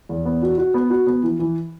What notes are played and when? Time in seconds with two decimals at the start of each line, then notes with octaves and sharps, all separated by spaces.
0.09 E2
0.25 B3
0.42 F#4
0.58 F#4
0.74 B3
0.90 F#4
1.07 B3
1.23 E3
1.39 E3